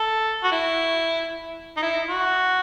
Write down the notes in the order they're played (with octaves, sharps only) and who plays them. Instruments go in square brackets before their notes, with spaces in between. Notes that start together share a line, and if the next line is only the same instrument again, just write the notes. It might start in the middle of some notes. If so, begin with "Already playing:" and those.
Already playing: [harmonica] A4
F#4
E4
D#4
E4
F#4